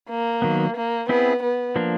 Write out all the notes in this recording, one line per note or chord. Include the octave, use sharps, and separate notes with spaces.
A#3
D#3 F#3 B3
A#3
B3 C4 E4 G#4
B3
F3 A#3 D4